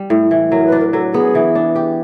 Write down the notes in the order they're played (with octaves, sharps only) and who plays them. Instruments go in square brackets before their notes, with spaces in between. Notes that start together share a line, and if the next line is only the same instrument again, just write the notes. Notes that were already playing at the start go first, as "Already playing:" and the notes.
Already playing: [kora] G3
A2
E3
[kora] F#3 [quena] A#4
[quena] B4
[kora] D4
[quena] A#4
[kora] F#3 [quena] A4
[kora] B3 [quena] G#4
[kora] E3
D4
G4